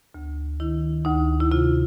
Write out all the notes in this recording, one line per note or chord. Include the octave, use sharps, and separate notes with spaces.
D2
D#3 E4
D2 D#4
E4
C3 F4